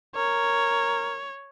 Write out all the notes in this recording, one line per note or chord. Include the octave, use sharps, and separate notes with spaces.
A#4 C#5